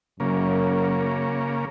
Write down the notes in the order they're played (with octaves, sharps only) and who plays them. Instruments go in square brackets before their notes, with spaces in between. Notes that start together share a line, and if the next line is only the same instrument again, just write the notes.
[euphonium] F#2 [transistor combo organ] C#3 A#3